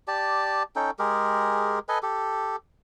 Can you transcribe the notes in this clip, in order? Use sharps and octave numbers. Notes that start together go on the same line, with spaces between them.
G4 D5 A5
C#4 D#4 A4 G5
G#3 G4 G#4 A#4
A4 B4 D#5 G#5
G4 A4